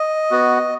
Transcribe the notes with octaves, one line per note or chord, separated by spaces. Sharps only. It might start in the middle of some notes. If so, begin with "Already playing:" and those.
Already playing: D#5
B3 F#4